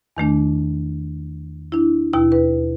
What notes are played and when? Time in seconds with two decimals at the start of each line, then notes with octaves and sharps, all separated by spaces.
0.16 E2 D#3 A3 D4
1.72 D4 E4
2.13 D#2 B2 E4 G5
2.32 B4